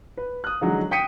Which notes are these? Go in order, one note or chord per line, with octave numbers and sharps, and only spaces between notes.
B4
D#6 F#6
D3 E3 F#3 G#3 D#4
G5 D#6 B6 C#7 D#7